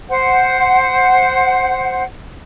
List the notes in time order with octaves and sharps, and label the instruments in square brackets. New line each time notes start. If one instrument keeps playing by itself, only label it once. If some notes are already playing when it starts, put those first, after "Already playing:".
[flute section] C5 F#5